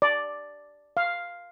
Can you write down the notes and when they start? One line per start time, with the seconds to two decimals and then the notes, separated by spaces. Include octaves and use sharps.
0.02 D5
0.97 F5